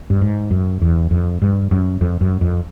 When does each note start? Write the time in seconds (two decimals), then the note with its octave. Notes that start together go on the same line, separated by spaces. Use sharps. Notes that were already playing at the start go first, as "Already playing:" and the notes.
0.10 G2
0.21 G#2
0.51 F#2
0.82 E2
1.11 F2
1.42 G2
1.71 F#2
2.01 F2
2.21 F#2
2.41 F2